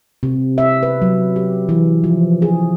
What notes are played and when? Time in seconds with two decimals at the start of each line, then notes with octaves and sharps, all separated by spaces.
0.23 C3
0.58 E5
0.83 B4
1.02 F#3
1.36 G4
1.69 E3
2.04 F3
2.42 G#4